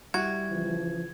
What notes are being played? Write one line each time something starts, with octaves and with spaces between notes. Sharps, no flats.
G3 E4 F#4 G#6
C#3 E3 F3